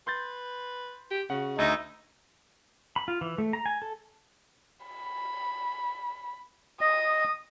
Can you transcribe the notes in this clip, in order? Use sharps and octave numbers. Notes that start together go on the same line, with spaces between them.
B4 C6 G6 A6
G4
C#3 F#4 F#5
D2 D#4 D#5 E5
B5
F4
E3
A3
A#5
G#5
A4
B5
D#5 D#6